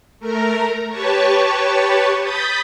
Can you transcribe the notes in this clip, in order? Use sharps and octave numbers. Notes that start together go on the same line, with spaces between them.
A3 A#4 A#5
G4 B4 C#5 A5 C#6
B5 D#6 G6 A6 B6